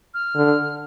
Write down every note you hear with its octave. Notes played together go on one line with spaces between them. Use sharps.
F6
D3